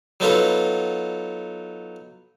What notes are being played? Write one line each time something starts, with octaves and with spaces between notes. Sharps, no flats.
F#3 B3 D#4 F4 A4 B4